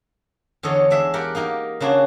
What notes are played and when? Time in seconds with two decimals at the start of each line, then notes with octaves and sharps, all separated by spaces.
0.63 E2 D3 A4 C#5 D#5
0.90 G#3 D4 E5
1.14 G4 A#4 D5 F#5
1.35 A#3 D#4 G4 A#4
1.80 C#3 A#3 D4 F#4 G#4